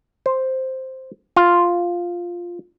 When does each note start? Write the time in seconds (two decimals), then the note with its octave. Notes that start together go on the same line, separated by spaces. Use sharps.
0.26 C5
1.36 F4